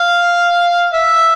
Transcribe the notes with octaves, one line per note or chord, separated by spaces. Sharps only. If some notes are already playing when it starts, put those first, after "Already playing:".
Already playing: F5
E5